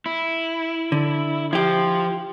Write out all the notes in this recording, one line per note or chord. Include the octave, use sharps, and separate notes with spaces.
E4
D3
F3 E4 G4